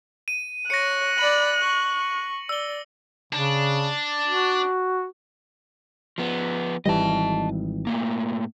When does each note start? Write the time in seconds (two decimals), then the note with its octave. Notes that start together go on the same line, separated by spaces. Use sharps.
0.28 D#7
0.70 C#5 F#6 A#6 C#7
1.18 D5 B5 F#7
1.61 C#6
2.49 D5 E6 G7
3.33 C#3 D4
4.27 F#4
6.18 F3 B3
6.86 G#1 E3 G3 D#5 A5
7.87 A2 A#3